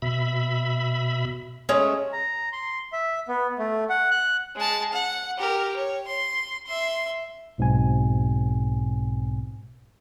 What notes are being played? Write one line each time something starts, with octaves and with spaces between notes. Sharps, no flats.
B2 E5 B5
G#3 A3 C#4
A#5
C6
E5
B3
A3
F#5
F#6
G#3 A5
F#5
G4 A#4
C#5
C6
E5 C6
B1 G#2 B2 C4 G#5